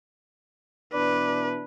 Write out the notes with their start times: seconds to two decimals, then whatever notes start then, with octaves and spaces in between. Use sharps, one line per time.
0.93 B2 E3 D4 B4 D5